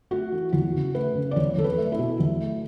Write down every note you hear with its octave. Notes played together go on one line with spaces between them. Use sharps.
A3 F#4
E3
E2 F#4
C#3
A3 B4
C#3
D5
E2 C#5
E2 A4
B4
A3
E4
B2
E2
A3